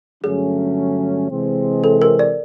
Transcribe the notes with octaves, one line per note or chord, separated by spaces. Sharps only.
G2 D3 F#3 A3 C#4 G#4
C3 E3 G#3 C4
A4
A#4
D5